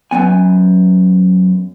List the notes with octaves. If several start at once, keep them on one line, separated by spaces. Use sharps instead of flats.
F#2 F3 B3 G#5